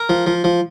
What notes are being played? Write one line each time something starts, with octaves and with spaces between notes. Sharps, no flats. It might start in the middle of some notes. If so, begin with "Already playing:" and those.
Already playing: A#4
F3
F3
F3